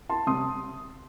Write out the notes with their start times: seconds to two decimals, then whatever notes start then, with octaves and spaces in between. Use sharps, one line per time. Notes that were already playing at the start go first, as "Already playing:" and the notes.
0.09 A5 C6
0.27 C3 G3 C6 D#6